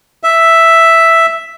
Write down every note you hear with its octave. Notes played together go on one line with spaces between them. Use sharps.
E5